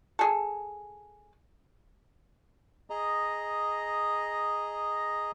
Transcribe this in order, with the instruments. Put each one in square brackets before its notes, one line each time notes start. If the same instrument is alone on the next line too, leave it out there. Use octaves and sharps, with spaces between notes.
[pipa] G#4 A4
[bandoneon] G#4 D#5 A#5